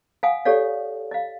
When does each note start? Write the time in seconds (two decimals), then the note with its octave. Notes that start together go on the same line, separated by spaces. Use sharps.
0.23 F5 F#5 G#5 D#6
0.45 G4 A4 C#5 D5 F5
1.11 D#5 F5